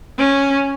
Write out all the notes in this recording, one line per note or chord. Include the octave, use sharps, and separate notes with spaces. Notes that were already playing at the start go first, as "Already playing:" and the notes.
C#4